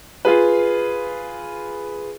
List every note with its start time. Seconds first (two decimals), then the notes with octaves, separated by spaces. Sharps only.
0.25 F4 G#4 B4